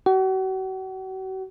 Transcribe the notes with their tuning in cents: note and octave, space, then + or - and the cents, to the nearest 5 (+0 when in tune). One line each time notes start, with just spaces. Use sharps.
F#4 +40